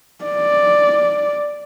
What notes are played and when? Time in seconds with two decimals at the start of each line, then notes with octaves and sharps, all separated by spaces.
0.25 D5